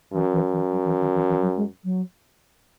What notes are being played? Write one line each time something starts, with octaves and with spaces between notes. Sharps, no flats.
F#2 E3
E3
E3
F#3
E3
D#3
E3
E3
F#3
G#3
F#3